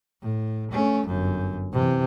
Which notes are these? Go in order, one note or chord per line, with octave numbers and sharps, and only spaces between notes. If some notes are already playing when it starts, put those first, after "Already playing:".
A2
A3 C#4
G1 F#2
C3 E3